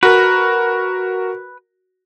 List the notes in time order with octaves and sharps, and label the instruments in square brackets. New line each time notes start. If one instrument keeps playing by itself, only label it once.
[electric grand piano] F#4 A#4 [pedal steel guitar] B4